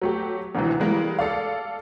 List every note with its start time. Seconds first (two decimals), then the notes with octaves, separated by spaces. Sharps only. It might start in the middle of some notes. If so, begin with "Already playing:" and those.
0.02 F#3 A3 G4
0.55 G#1 D2 G#2 C3 E3
0.80 E3 G3 G#3 A#3
1.19 A4 D5 F5